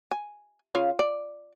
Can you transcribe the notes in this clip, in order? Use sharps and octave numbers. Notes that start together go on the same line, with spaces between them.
G#5
C#3 F4 F5
D5